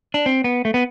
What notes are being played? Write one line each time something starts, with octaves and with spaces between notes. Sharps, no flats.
D4
C4
B3
A3
B3